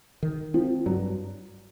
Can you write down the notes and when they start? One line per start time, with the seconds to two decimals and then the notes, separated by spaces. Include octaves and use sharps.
0.23 D#3
0.54 F3 C4
0.86 G2 F#3